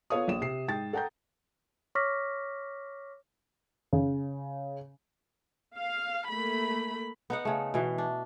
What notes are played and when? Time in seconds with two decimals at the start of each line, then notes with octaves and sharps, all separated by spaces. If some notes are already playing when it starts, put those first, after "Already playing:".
0.10 B3 F4 A4 C#5 F5 D#6
0.28 A#1 E7
0.41 C3 C7
0.68 G#2 G5 A6
0.93 A4 F#5 G5 A#5 G6
1.95 C#5 C#6 D6 F6 A#6 B6
3.93 C#3
5.77 F5
6.30 A3 A#3 B5
7.30 B3 D#4 F#5
7.45 C#3 A3
7.74 B2 E3
7.98 D4